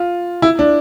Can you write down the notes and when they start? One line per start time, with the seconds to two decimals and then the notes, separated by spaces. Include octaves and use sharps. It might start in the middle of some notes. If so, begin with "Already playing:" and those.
Already playing: F4
0.42 E4
0.59 D4